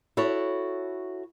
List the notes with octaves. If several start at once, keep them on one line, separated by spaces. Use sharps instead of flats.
E4 F#4 A4 C#5